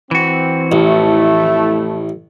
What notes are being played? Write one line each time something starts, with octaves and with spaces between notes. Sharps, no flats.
E3 C4 F#4
A1 F2 A3 E4